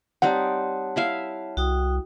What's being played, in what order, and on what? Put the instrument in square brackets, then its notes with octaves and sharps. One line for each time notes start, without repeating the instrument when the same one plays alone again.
[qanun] G3 C4 D#4 [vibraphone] C#5 A5 [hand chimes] F#5
[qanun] E4 E5 F5
[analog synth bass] C2 [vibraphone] F#4 G5 D#6